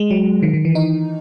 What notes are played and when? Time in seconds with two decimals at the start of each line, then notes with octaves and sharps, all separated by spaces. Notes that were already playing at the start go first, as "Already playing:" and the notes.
Already playing: G#3
0.11 F#3
0.42 D#3
0.54 D#3
0.65 E3
0.75 D#4